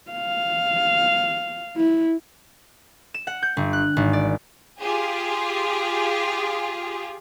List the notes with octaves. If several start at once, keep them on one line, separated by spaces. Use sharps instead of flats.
F5
E4
E7
F#5
G6
G1
F#6
G#1
D5
F4 G4 G#4